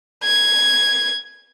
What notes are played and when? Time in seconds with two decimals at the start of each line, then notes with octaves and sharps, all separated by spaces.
0.24 G#6